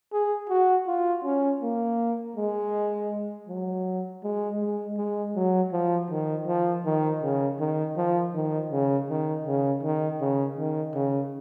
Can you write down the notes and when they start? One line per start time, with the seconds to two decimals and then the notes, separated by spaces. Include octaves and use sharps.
0.13 G#4
0.49 F#4
0.87 F4
1.24 C#4
1.62 A#3
2.36 G#3
3.48 F#3
4.23 G#3
4.60 G#3
4.98 G#3
5.35 F#3
5.72 F3
6.11 D#3
6.47 F3
6.85 D#3
7.22 C#3
7.59 D#3
7.97 F3
8.34 D#3
8.71 C#3
9.09 D#3
9.47 C#3
9.83 D#3
10.21 C#3
10.58 D#3
10.95 C#3